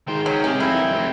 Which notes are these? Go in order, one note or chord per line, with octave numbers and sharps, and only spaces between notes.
G#2 D#3 C5 G5
F#3 C#4 G#4
C3 G#3 C#4 D#4
F2 G#2 C4 E4
D#3 E3
F1 F#3 C4